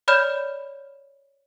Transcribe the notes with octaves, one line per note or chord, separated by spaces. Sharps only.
C#5 D5 B5 F6 G6 E7